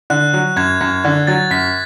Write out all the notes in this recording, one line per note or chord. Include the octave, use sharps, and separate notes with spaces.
D3 F#6
F#3
F#2 G#6
F#2
D3 G#6
F#3 A6
F#2 B6